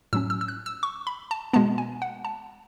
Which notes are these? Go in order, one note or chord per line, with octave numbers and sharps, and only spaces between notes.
A2 F#3 C#4 E6
E6
E6
F#6
E6
C#6
B5
A5
B2 G#3 B3 A5
G#5
F#5
A5